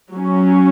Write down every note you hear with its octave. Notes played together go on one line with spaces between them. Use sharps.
F#3 C#4